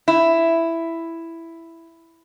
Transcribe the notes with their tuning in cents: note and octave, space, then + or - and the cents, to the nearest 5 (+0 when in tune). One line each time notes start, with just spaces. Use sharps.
E4 +5